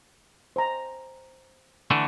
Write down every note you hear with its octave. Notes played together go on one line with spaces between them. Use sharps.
C5 G#5 A#5
D3 E3 A3